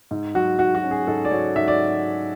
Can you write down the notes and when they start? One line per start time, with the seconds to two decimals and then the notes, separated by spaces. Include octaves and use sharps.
0.11 G#2
0.35 F#3 F#4
0.59 G#2 F#4
0.75 F#4
0.83 C#4
0.91 G#4
1.07 G#2 A4
1.25 D5
1.31 F#3 C#5
1.56 G#2 E5
1.68 D5